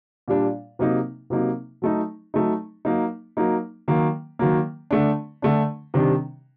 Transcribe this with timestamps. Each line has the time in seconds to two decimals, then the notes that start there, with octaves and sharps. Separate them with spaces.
0.28 A#2 G3 D4
0.79 C3 F#3 A#3 D#4
1.30 C3 F#3 A#3 D#4
1.82 F#3 A3 D#4
2.34 F#3 A3 D#4
2.85 F#3 A#3 D#4
3.37 F#3 A#3 D#4
3.88 D#3 F#3 A#3
4.39 D#3 F#3 A#3
4.91 D3 A3 D4
5.42 D3 A3 D4
5.94 C3 D#3 G3 D4